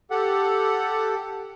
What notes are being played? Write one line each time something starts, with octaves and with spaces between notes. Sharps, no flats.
G4 A4 F#5